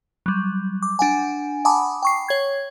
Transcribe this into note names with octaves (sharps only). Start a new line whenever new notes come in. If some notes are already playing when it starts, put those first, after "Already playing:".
F#3 G3
D6
D4 F#5 G#5
F#5 G#5 A5 B5 D6 D#6
G5 C#6 C7
C#5 G#6